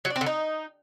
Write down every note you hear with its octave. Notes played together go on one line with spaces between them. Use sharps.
F#3
D4
C4
D3
D#4